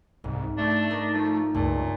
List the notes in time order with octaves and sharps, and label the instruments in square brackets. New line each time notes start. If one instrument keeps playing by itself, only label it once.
[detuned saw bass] C2 [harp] G#2
[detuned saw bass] A3 [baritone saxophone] D4
[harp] D#4 A#4 D5
[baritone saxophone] F3 [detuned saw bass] A3
[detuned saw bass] C#2 [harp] G2 A3 [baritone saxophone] A#2